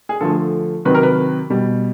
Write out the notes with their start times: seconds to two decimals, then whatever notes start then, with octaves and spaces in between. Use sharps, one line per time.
0.09 G#4
0.21 D3 F3 A3 A4
0.85 C3 D#3 F#3 B4
0.95 A#4
1.03 B4
1.50 B2 G3